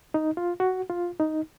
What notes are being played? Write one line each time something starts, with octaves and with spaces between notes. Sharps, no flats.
D#4
F4
F#4
F4
D#4